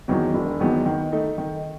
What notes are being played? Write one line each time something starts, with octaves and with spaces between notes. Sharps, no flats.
E2 D#3 F#3 B3
E1
E2 D#3 F#3 B3
D#3
A3 D#4
D#3